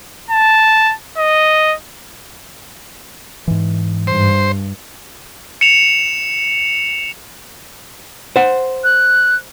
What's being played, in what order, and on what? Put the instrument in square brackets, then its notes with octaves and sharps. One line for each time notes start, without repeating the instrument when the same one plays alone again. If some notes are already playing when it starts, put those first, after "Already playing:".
[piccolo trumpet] A5
D#5
[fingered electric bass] G#2 E3
[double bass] G2 [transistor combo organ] C5
[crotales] C#7 E7 F7
[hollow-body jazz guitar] C5 F#5
[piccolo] F#6